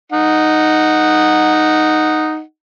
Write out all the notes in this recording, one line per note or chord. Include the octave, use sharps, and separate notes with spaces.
D#4 F#5